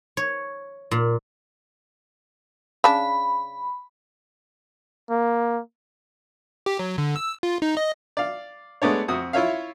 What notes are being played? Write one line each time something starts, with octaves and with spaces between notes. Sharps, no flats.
C#5
A#2
C#3 D4 B5
A#3
G4
F#3
D3
E6
F4
D#4
D#5
D5 F5
G#3 A3 B3 D4 C#5
F2 F#4 D#6
E4 F4 C#5 E5 F5